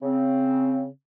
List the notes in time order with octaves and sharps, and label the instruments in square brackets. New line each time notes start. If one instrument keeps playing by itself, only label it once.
[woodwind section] C#3 C4